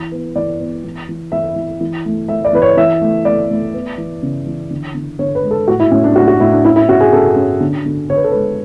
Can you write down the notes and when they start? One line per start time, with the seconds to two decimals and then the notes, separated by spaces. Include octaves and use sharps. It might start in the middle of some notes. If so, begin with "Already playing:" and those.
Already playing: E3
0.12 B3
0.35 E3 D5
0.60 B3
0.84 E3
1.09 E3
1.32 E3 E5
1.56 E3
1.81 E3
2.05 A3
2.28 A3 E5
2.45 D5
2.53 E3 B4
2.62 C#5
2.77 E3 E5
3.01 A3
3.25 A3 D5
3.50 A3
3.74 B3
3.98 E3
4.23 C#3
4.46 E3
4.71 D3
4.95 D3
5.19 D3 C#5
5.35 B4
5.43 G#3
5.51 A4
5.68 A2 F#4
5.80 E4
5.91 A2 C#4
6.04 D4
6.16 A2 F#4
6.28 F#4
6.40 A2 E4
6.52 D4
6.64 C#4 E4
6.76 E4
6.88 C#4 F#4
7.00 G#4
7.13 C#4 A4
7.36 C#4
7.60 D3
7.86 D3
8.10 D3 C#5
8.16 B4
8.24 A4
8.32 G#3 B4